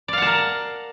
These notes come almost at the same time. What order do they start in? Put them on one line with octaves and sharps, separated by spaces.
D5 F5 F#5 A5 A#4